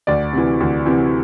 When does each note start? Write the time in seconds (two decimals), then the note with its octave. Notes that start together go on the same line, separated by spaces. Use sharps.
0.07 D2 D5
0.33 C3 E3
0.60 D2
0.86 C3 E3